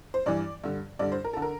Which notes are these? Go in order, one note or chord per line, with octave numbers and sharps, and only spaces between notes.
C5
G2 E3 D5
G2 D3
G2 D3 D5
C5
A#4
D3 A4
A#4